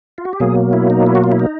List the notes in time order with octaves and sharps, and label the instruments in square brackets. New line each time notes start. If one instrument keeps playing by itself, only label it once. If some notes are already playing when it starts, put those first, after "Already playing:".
[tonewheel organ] F4
F#4
G4
B2 F#3 A#3 G#4
E4
D#4
E4
F#4
F4
E4
D#4